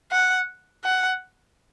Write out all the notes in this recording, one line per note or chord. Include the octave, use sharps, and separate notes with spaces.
F#5
F#5